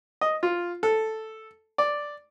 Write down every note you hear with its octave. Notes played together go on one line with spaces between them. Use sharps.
D#5
F4
A4
D5